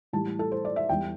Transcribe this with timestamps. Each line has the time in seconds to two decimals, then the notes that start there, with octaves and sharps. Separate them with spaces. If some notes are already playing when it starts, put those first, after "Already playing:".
0.13 A2 E3 G3 A5
0.39 A4
0.52 C5
0.65 D5
0.76 E5
0.89 E2 E3 G3 G5